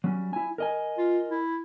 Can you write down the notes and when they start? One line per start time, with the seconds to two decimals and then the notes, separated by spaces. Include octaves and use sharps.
0.04 F#3 G3 C#4
0.33 E4 G#5
0.58 A#4 D#5 G#5
0.98 F4
1.30 E4